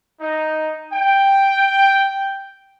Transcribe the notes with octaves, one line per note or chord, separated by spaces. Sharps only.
D#4
G5